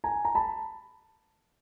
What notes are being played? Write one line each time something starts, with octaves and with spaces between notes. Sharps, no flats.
G#5 A#5
A#5
A5 B5